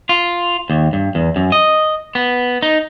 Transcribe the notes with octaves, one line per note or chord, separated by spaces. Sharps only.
F4
D#2
G2
E2
F#2
D#5
B3
D#4